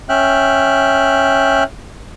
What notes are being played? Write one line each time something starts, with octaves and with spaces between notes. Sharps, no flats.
C#4 E5 G5 F6 F#6